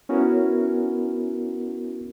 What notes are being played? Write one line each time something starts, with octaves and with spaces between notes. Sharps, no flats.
B3 C#4 E4 F#4 A#4